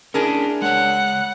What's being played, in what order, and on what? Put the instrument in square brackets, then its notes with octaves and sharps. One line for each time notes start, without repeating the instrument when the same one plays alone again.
[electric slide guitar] C#4 E4 [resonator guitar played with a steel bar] D4 G#4 A#4
[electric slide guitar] G#3 C#5 [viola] F#5